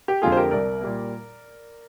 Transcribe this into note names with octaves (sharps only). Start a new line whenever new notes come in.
G4
F2 D3 G#3 F4 G#4
C5
G4 A#4
C2 A#4 D5
A#2 G3 A#3